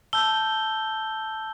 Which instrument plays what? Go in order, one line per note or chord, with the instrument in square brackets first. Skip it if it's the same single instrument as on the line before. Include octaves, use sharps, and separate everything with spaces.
[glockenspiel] A5 E6 G6 G7